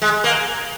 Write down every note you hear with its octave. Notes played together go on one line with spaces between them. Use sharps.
G#3
A#3